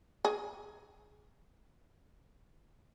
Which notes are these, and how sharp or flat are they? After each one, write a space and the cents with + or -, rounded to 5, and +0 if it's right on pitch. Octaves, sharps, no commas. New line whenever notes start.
G#4 +0